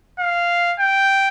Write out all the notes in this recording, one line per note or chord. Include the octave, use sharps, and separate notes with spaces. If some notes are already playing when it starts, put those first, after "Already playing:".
F5
G5